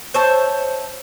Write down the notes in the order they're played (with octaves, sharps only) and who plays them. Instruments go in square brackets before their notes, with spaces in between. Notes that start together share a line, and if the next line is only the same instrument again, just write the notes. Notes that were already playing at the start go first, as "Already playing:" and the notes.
[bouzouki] C5 C#5 E5 A5